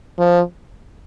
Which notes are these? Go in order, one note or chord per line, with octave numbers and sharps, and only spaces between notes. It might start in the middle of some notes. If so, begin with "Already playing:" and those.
F3